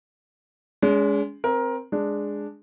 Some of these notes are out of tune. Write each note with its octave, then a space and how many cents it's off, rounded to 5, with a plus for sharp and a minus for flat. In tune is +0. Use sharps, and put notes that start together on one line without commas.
G#3 +0 C#4 +45
C4 +0 A#4 +20
G#3 +0 D4 +0